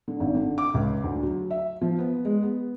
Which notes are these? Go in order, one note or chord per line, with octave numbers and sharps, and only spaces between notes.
D3
G#1
D3
D6
C#2
D2
F#3
E5
F3
B3
G#3
B3